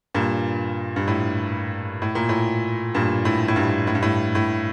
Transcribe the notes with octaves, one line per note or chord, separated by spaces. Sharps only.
G2 A#2
G2
A2
A2
A#2
A2
G2 A#2
A2
A2
G2
A2
G2
A2
A2